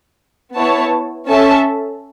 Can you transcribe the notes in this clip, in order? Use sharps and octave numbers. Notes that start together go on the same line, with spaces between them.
B3 E4 C#5 A5
C#4 A4 E5 A5